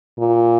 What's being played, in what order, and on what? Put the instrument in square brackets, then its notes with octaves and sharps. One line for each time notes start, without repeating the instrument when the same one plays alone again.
[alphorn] A#2